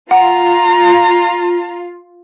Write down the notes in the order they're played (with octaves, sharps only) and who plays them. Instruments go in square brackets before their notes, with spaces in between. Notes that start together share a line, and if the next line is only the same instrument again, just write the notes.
[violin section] F4 [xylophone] F#5 [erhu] A#5